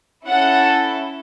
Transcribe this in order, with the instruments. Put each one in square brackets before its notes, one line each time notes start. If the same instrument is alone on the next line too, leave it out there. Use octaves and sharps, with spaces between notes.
[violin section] C#4 E4 A4 F#5